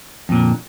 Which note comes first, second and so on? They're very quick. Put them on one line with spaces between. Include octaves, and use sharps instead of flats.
F2 A#2 D3